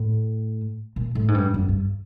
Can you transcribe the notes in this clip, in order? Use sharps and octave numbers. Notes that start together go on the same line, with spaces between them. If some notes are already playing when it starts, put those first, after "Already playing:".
Already playing: A2
A#2
A2
G#2
G2
F#2
G2